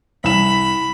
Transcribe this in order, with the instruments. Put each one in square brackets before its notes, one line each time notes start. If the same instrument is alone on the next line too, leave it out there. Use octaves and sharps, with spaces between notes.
[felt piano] C2 E7 [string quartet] B5